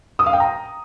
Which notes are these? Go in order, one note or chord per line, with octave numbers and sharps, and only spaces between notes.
D#6
F5
G5
A#5